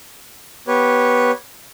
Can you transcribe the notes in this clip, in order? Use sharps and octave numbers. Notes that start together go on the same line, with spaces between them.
B3 G4 B4 C#5